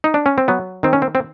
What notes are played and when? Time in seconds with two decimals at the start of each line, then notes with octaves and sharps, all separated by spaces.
0.04 D#4
0.14 D4
0.26 C#4
0.38 C4
0.48 F#3 B3
0.83 D#3 C4
0.93 C#4
1.02 C4
1.15 C4